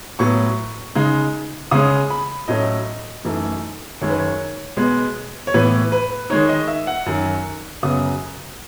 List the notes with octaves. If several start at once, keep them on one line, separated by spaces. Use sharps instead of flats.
A2 F#3 B3 C#6
C#3 G#3 D#4
C#3 G#3 C#4 D#6
B5
A2 F#3 A3 C#4 D#5
F#2 E3 A3 D#4
F#2 D#3 G#3 C#5
B4
C#5
B2 G#3 B3
C#5
A2 E3 B3 B4
B4
D#3 G#3 D#4 C#5
D#5
E5
F#5
F#2 D#3 F#3
F#2 C#3 F#3 B3 D#6